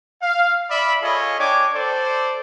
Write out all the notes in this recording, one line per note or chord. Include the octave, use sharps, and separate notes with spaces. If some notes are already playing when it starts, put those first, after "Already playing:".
F5
D5 E5 B5
F4 G#4 A4 C#5 D#5
D4 C#5 G5 G#5 D6
A4 C5 D5